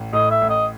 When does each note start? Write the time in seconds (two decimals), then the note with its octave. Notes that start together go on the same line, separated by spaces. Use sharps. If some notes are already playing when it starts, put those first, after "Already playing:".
Already playing: A1
0.13 A2 D#5
0.31 E5
0.41 A1
0.50 D#5